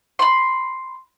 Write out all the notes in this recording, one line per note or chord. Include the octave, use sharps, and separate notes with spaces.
B5 C6